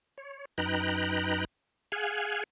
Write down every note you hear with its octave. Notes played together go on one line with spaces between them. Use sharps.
C#5
F#2 D#4 B4 G5 A#5 F#6
G#4 F5 F#5 G#5